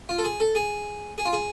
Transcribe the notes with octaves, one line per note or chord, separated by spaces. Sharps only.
F4
A4
G#4
A4
G#4
G#4
F4
G#4